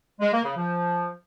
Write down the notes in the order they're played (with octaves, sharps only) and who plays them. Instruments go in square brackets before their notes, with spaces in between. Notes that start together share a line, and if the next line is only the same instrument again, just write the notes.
[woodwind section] G#3
A#3
C#3
F3